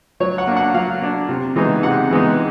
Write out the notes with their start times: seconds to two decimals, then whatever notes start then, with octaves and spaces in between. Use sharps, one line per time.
0.20 F#3 C#5
0.38 F#5
0.47 A#3 D4
0.57 F#5
0.74 F#3 F5
1.02 A#3 D4
1.29 C3
1.56 E3 G#3 B3 D#4
1.83 C3 F#5
2.11 E3 G#3 B3 D#4